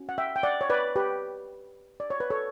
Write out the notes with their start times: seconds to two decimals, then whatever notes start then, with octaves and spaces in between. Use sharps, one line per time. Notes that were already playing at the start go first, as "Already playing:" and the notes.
Already playing: C#4 F#4
0.09 F#5
0.18 E5 G5
0.36 G5
0.43 D5 F#5
0.61 C#5
0.70 B4 D5
0.96 G4 B4
2.00 D5
2.10 C#5
2.20 B4
2.30 A4 C#5